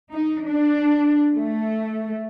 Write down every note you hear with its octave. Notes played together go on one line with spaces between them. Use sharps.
D#4
D4
A3